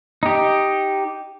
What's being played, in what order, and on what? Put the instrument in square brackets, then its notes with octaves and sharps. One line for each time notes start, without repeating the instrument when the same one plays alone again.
[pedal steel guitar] D#4 G4